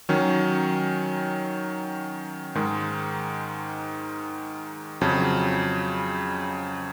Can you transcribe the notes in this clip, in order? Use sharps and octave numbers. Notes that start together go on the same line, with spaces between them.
D#3 F#3 C#4
G#2 D#3 G#3
F2 C#3 F#3